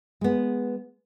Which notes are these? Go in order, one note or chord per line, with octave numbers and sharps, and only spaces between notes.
G#3 B3